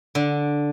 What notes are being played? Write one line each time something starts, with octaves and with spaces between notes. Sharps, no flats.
D3